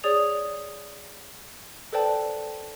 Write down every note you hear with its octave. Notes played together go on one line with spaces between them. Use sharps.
G#4 C#5 D5 D#6 F7
A4 B4 C5 D5 G5 A5